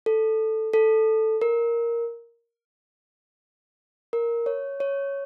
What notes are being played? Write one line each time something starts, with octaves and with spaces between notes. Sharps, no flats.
A4
A4
A#4
A#4
C#5
C#5